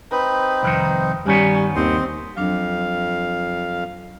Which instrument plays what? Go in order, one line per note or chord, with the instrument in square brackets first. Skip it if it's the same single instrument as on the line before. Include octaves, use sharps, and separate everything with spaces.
[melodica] C4 D#4 [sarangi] B4
[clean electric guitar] C2 F2 D#3
[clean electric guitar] G2 D#3 B3 [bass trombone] G3 [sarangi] C#4
[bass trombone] D#2 [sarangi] C4 [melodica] C5 D#5 C6
[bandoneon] F2 F5 [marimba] F#3 D4